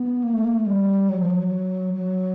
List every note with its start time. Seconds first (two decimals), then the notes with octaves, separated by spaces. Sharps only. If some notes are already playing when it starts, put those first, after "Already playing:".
Already playing: B3
0.23 A#3
0.34 A3
0.45 A#3
0.55 A3
0.66 G3
1.09 F#3
1.20 F3
1.30 F#3
1.94 F#3